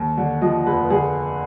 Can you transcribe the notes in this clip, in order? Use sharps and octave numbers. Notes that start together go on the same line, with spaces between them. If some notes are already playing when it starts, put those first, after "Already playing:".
Already playing: D#2
D3
F3 D#5
F1 B4
D3 G#4